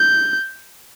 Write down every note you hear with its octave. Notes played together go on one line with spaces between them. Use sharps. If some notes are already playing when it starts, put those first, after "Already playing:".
Already playing: G6